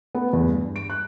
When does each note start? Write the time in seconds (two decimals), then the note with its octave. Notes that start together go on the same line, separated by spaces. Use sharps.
0.15 B3
0.33 E2
0.49 G2
0.76 D7
0.90 F#6